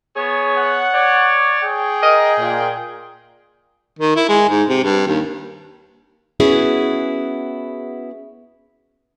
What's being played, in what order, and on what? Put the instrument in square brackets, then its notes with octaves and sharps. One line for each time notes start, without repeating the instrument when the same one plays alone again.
[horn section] B3 G#4 C#5
[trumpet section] F#5
[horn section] C#5 D5
[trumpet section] G#4 G5
[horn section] A#4 D#5
A#2
[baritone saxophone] D#3
E4
G#3
G#2
C3
G2
D#2
[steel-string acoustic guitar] B3 C#4 E4 F#4 G#4 B4